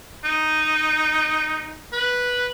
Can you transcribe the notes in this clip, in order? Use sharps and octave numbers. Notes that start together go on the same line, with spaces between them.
D#4
B4